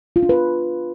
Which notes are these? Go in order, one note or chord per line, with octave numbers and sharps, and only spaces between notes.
F4
D4
B4